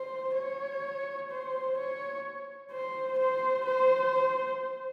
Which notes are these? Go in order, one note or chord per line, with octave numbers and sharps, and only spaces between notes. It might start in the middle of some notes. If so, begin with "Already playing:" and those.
Already playing: C5
C#5
C5
C#5
C5
C5
C5